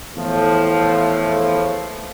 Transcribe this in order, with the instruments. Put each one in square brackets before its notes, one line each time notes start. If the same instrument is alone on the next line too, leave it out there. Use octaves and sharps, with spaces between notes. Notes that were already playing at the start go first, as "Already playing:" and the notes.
[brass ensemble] E2 A2 F3 A3